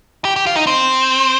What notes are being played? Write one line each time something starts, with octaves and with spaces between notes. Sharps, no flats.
G4
G4
F4
D#4
C4